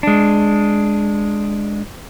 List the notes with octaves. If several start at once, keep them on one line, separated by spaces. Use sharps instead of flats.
G#3 D4